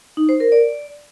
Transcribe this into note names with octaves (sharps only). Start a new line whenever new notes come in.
D#4
C5
A#4
D5